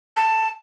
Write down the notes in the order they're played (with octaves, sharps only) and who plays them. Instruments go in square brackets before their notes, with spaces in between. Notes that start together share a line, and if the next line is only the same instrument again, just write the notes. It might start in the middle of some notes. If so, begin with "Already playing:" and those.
[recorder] A5